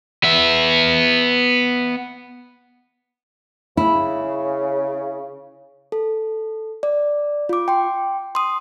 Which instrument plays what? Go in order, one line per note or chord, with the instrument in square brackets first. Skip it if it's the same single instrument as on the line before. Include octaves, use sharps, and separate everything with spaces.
[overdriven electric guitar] B3 E5
[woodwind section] C#3 [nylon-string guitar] E4
[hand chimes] A4
D5
F4 D6
G5 C6
C6 D#6